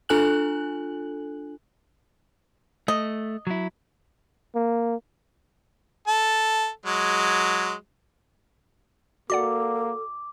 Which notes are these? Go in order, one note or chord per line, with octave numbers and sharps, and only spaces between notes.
D4 F4 A4 G#5 F#6 F#7
A3 D#5
F#3 E4
A#3
A4
F#3 G#3
A#3 F#4 A4 D5 F#5 D6